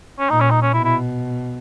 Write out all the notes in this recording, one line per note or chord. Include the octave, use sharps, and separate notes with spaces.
C#4
A#2 D#4
C#4
D#4
C#4
B2 E4
E4